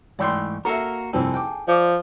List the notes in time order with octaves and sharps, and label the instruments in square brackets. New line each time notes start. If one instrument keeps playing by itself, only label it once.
[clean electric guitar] G#2 E3 A3 [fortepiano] D5 G5 C6
[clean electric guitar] A#3 F#4 A#4 [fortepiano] A4 E5
[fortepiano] C2 F2 C4 [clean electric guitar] G#4 A4
[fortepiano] G5 D6
[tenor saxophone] F3 [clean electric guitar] D5